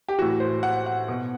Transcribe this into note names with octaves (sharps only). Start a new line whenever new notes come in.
G4
A2 E3 F#4
C5
F#5
F#5
B2